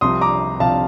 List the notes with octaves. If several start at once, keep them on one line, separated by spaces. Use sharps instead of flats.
C2 C3 F3 C6 D#6
A#5 D6
C2 C3 F3 F5 A5